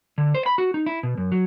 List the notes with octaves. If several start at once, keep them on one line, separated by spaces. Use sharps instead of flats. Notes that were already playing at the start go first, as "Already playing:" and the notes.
D3
C5
B5
F#4
D#4
E4
B2
F#2
F#3